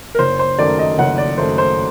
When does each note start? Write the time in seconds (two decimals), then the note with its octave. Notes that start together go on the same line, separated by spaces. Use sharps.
0.15 A#4
0.19 F#1 C5
0.39 C5
0.58 F#2 D#3 A3 D5
0.79 D#5
0.98 F#1 F#5
1.18 D5
1.38 F#2 D#3 A3 C5
1.58 C5